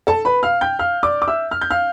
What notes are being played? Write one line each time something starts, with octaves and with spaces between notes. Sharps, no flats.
A4 A5
B4 B5
F5 F6
G5 G6
F5 F6
D5 D6
D6
E5 E6
F6
G6
F5 F6